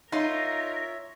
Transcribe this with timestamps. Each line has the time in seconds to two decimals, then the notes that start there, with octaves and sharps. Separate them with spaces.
0.12 D#4 F4 A#4 C#5 E5 C6